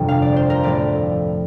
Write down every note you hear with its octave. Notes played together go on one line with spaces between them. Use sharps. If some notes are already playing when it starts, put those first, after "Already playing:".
Already playing: G1 F2 C3
F5
D5
C5
A#4
A2 F3 A3 D5